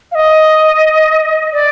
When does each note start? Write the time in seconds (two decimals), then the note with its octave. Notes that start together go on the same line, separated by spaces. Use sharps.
0.12 F5
0.15 D#5
1.53 D5